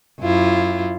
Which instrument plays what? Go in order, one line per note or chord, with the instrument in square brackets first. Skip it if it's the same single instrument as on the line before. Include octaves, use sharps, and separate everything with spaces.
[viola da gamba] F#2 E4 F4